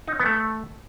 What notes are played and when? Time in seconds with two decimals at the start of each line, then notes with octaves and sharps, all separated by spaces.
0.08 D#4
0.14 C#5
0.20 B3
0.26 A3